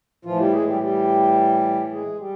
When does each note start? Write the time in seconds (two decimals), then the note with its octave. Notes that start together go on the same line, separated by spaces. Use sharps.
0.25 A2 E3 F3 F4
0.39 G3 G4
0.52 G#3 G#4
0.67 G3 G4
0.81 G3 G4
1.92 G#3 G#4
2.19 G3 G4